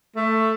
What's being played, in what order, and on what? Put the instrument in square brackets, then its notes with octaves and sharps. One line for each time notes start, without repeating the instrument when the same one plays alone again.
[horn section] A3